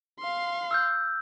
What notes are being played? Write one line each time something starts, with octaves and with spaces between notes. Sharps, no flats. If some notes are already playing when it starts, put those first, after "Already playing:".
F5 C6
E6 F6 G6